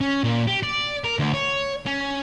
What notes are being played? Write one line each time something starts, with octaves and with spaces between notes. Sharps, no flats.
C#4
A#2
G4
D5
A#4
D2
C#5
C#4